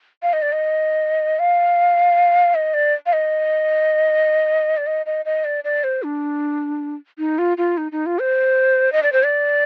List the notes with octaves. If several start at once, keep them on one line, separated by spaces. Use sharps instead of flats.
F5
D#5
D5
D#5
F5
D#5
D5
F5
D#5
D5
D#5
D#5
D#5
D5
D5
C5
D4
D#4
F4
F4
D#4
D#4
F4
C5
D#5
D5
C5
D5